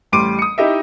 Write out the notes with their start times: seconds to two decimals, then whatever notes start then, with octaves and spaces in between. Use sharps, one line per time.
0.12 A1 G3 C6 D6 D7 D#7
0.39 D#6 C#7
0.58 D#4 E4 G4 D#5 E5